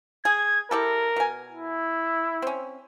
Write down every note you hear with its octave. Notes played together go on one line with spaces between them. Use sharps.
G#4 G#6
E4 G4 A4 A#4
B2 G#5
E4
C4 C#4